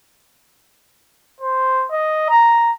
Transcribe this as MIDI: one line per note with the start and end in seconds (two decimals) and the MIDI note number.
1.41 1.86 72
1.92 2.28 75
2.30 2.72 82